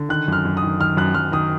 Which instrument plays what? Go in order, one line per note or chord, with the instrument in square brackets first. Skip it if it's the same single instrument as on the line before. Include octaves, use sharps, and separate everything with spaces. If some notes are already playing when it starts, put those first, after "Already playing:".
Already playing: [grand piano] D3
D#3 F#6
F#2 F6
F#2
D#6
D#3
D#3 F6
F#2 F#6
F#2 F6
D#3 D#6